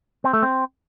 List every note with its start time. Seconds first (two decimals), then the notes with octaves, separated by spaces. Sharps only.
0.24 C4
0.33 A3
0.43 C4